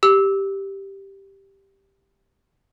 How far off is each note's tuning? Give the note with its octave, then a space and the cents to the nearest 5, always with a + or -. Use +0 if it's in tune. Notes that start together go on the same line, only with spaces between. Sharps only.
G4 +0 E6 -15